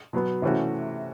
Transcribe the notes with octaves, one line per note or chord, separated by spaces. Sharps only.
B2 F#3 B3
C3 E3 A3 C#4 F#4